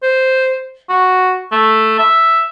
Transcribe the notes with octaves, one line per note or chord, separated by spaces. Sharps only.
C5
F#4
A3
E5